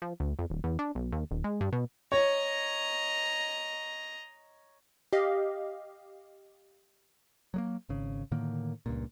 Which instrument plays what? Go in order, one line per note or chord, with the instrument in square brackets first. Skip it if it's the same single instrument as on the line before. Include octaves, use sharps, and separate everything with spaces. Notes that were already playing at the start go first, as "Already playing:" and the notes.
[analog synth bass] F3
D2
F2
D#1
E2
D4
B1
D#2
D#1
G#3
G2
B2
[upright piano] C#5 [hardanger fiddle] D#5 A#5
[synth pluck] G4 D#5 F5
[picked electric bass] F#3 G#3 A#3
G#1 C#3
A2 D3 D#3 A#3
C#2 G2 A#2